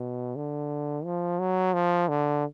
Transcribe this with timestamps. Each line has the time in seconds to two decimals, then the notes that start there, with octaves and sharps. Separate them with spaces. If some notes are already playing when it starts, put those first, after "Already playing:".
Already playing: B2
0.36 D3
1.05 F3
1.39 F#3
1.74 F3
2.09 D3